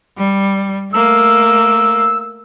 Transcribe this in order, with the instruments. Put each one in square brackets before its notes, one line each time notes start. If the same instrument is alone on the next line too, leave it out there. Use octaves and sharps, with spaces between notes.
[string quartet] G3
[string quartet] A3 A#3 [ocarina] E6